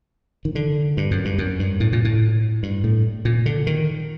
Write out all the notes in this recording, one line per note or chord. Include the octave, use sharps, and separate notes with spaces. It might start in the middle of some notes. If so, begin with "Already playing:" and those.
D#3
D3
G2
F#2
G2
F#2
G2
A2
A#2
A2
G2
A2
A#2
D3
D#3